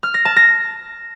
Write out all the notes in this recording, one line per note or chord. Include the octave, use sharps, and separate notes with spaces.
F6
A#6
A5
A#6